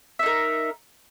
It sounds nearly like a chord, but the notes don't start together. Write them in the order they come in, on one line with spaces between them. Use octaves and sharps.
E5 D#4 A#4